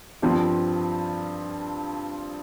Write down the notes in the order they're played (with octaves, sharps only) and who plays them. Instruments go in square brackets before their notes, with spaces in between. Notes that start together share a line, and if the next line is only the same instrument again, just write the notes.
[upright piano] G2 F3 C4